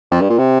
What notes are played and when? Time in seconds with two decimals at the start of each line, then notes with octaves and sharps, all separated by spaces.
0.11 F2
0.21 G2
0.30 A#2
0.38 C3